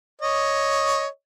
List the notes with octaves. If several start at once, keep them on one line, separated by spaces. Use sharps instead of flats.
C#5 D#5